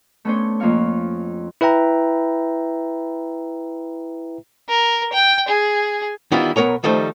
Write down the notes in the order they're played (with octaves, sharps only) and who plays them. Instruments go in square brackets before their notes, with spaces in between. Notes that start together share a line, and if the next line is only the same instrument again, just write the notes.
[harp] A3 B3 C#4 D4 C5 C#5
F2 A#3 A#4 F5 C#6
[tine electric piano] E4 B4 E5 G5 A#5
[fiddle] A#4
G5
G#4
[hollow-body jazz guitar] D#3 E3 G3 B3 E4 F4
B1 B3 A#4 C#5 A#5
D#3 F3 G3 A3 D#4 C5